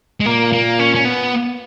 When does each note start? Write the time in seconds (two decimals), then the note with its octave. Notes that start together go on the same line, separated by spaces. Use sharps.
0.20 G#3
0.26 A#2 A#3
0.53 A#3
0.79 C#4
0.95 C#4
1.05 B3